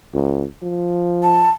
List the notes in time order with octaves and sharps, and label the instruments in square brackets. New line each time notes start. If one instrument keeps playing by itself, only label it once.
[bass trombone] C#2
F3
[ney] A5